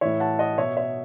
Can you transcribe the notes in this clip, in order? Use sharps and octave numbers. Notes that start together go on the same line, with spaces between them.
A2 E3 C#5 E5
F#5 A5
D#5 F#5
B2 C#5 E5
C#5 E5